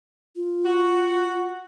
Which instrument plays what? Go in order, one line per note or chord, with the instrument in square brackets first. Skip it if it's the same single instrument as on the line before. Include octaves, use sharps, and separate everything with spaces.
[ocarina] F4
[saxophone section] F#4